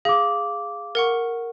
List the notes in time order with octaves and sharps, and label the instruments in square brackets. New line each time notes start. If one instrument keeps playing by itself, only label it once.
[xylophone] G#4 [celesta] F5 D6
[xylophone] A#4 F#5 C#6